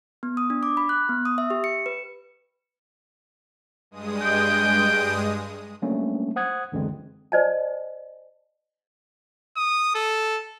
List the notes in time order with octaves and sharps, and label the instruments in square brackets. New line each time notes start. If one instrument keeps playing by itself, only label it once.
[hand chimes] B3
D#6
D4
D6
B5
F#6
B3
D#6
E5
G4
C#7
B4
[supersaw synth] G2 G#3 D#6
[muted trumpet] G5
[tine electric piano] F#3 G3 A3 A#3 C#4 D4
C5 F#5 D#6 F#6 G#6
C#2 F#2 D3 E3 G#3 C4
[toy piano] C5 D5 D#5 G#5 A5
[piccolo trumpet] D#6
A4